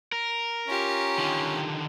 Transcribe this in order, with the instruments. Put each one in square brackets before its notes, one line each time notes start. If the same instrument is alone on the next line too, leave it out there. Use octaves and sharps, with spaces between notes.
[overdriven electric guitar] A#4
[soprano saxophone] C#4 [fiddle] F4 G4
[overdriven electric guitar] D3 D#3